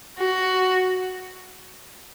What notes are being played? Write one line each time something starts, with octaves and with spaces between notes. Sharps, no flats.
F#4